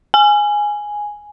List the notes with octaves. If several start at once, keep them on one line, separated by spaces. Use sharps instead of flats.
G#5